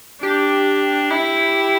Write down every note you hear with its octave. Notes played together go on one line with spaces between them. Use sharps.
D4 G4
E4